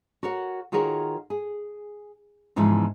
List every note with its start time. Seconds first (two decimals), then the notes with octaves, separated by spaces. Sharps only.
0.23 F#4 A#4 C#5 F#5
0.72 D#3 F4 F#4 G#4 A#4 C#5
1.30 G#4
2.56 E2 G#2 C#3 E3 F3